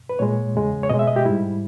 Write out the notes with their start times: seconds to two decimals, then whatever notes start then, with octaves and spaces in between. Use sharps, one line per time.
0.09 B4
0.19 A#2 G#3 C#5
0.55 E2 C#3 G#3
0.83 C#5
0.90 B2 G#3 D#5
0.99 E5
1.07 D#5
1.16 G4
1.25 G#2 G3 E4